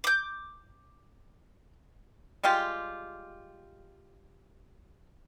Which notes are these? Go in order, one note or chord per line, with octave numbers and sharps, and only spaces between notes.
D6 G6
G3 G#3 F4 G4